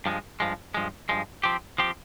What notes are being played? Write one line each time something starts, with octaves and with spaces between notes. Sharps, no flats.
G2 F3 G#3
G2 F3 G#3
G2 F3 G#3
G2 F3 G#3
F3 C4 G4
F3 C4 G4